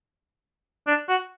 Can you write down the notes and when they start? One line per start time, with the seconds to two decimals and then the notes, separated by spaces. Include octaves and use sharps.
0.87 D4
1.09 F#4